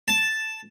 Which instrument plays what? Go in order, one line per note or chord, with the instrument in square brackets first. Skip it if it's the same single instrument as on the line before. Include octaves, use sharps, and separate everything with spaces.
[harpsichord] A5